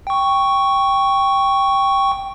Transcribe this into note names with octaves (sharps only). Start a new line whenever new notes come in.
G5 C#6